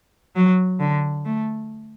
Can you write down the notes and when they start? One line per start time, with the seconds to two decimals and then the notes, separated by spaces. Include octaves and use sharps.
0.35 F#3
0.80 D3
1.25 A3